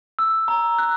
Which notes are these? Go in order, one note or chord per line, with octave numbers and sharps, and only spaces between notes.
E6
A#5
F#6